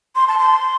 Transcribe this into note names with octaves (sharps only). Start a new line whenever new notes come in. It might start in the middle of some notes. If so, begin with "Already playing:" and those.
C6
A5
C6